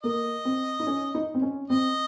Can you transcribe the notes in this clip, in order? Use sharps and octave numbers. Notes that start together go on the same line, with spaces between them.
A#3 D#5
C4
D#4
C#4
D#4
C4
C#4
C4 D#5